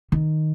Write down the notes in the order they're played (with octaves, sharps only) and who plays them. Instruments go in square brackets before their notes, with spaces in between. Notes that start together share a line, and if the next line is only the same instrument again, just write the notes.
[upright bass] D#3